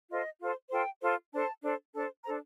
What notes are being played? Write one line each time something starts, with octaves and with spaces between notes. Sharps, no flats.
F4 A4 C5 D#5
F4 A4 C5
F4 A4 C5 G5
F4 A4 C5
D4 A4 C5 A5
D4 A4 C5
D4 A4 C5 A5
D4 A4 C5 A#5